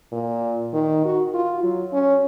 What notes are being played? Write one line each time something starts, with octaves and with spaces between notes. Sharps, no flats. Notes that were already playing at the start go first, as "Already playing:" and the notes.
A#2
D#3
F#4
F4
F#3
C#4